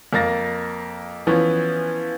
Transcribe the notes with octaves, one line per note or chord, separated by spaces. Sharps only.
F2 A#3 A6 A#6
E3 F3 B3 C#4